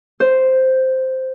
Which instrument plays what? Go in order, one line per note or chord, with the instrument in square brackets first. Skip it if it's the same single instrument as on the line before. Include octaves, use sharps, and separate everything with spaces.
[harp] C5